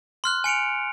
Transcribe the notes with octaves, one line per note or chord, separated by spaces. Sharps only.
C6 F6 F#6
G#5 C#7 D7 F7